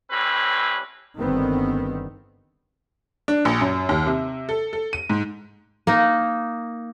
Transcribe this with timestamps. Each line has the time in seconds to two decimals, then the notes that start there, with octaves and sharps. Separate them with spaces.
0.11 A2 G3 C4 C#4 B4
1.18 G1 D#3 B3 C4
3.28 D4
3.45 A#1
3.61 F#2
3.89 D#2
4.06 C3
4.49 A4
4.73 A4
4.93 D#7
5.10 G#2
5.87 A#3 D#4